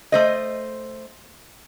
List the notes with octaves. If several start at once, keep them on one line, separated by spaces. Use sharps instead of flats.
A3 C5 D#5